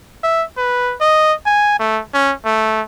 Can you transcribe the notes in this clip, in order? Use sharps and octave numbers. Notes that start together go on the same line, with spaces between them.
E5
B4
D#5
G#5
A3
C#4
A3